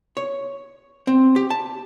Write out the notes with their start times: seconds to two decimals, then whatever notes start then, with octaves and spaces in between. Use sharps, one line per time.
0.17 C#5
1.07 C4
1.36 G4
1.50 A5